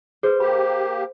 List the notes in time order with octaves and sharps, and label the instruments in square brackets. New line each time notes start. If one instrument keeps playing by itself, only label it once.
[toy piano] G#4 B4 [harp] C5
[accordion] A#3 G4 [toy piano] B5